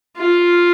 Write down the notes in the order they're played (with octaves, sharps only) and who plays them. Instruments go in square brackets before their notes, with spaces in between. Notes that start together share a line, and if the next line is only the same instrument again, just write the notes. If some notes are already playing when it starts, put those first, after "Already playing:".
[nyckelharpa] F4